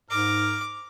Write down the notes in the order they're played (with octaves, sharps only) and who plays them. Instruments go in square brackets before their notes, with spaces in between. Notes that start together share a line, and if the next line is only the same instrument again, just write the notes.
[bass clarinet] G#2 [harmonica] A#4 [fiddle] D6